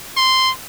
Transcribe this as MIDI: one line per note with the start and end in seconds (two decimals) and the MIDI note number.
0.17 0.50 84